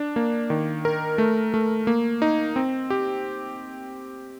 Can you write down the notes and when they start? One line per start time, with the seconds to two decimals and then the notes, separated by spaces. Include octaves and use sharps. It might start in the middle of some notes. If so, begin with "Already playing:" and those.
Already playing: D4
0.16 A#3
0.50 D#3
0.85 A#4
1.18 A3
1.54 A3
1.87 A#3
2.22 D#4
2.56 C4
2.90 G4